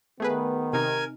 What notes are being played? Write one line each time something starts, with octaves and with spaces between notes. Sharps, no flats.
D#3 A3 B3 G#4 B4
C3 D#4 A#4 G#5